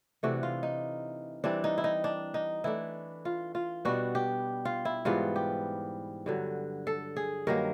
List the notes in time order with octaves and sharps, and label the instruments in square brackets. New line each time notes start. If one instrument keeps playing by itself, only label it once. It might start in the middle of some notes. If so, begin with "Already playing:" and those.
[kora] C3 E3 A3 D4 F#4
F4
D#4
E3 G3 C4 D4
D#4
E4
D#4
D4
D#4
E3 A3 D4 E4
F4
F4
B2 G3 B3 D4 F#4
G4
F4
E4
G#2 E3 G3 B3 F4
G4
G2 D3 F#3
A4
G#4
G2 D#3 F#3 A#3 A#4